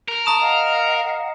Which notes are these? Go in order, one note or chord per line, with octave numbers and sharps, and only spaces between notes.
A#4
A5 A#5 C#6 D#6 E7
D#5 F5 F#5